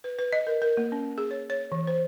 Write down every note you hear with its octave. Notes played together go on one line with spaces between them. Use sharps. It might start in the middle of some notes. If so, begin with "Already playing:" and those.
B4
B4
D#5
A#4
A#4
A#3
C#4
G#4
C#5
C#5
E3
C5